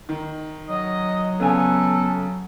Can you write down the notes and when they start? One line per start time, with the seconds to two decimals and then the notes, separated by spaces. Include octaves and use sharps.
0.09 D#3 D#4
0.69 F#3 D#5
1.40 C#3 B3 A4 G#5